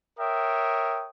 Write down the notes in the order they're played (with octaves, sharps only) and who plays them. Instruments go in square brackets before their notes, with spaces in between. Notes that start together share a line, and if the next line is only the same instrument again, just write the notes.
[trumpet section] A#4 C#5 E5 G5 D#6